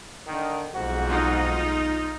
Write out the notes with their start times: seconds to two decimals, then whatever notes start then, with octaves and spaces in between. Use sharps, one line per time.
0.27 D3 D#3
0.75 B1 F2 G#2 G#3 F#4
1.07 D#4 F4